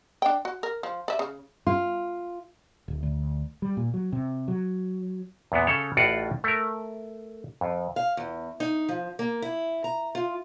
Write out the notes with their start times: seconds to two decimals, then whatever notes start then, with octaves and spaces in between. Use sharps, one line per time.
0.22 D4 G5
0.45 F#4
0.63 A#4
0.83 F3
1.08 D5 E5
1.19 C#3
1.67 F4
2.88 D1
3.03 D2
3.62 G3
3.77 A#2
3.94 F#3
4.13 C3
4.48 F#3
5.52 E2 A#2 B3
5.67 C#3 A4 C#5
5.97 A1 A2 F4 F#4 D5 F#5
6.44 A3 A#4
7.61 F2
7.96 F5
8.17 E2
8.60 D#4
8.89 F3
9.19 A#3
9.42 E4
9.84 A#5
10.15 F4